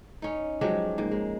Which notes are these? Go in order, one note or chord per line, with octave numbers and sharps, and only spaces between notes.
C#4 D#4
F3 F#3 G#3 G4
G#2 A#3
G#3